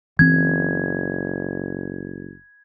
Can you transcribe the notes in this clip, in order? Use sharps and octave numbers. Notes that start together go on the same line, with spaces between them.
F#1 E3 C4 G#6